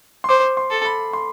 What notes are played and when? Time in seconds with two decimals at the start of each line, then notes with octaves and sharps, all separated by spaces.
0.24 C6
0.29 C5 D6
0.57 C6
0.71 A4
0.85 B5
1.13 C6